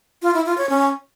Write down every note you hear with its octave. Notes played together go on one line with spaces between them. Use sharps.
F4
E4
F4
C#5
C#4